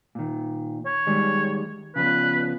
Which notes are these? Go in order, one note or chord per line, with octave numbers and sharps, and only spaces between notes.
A#2 D#3
C#5
D#3 G3 G#3
C#3 F3 B3 B4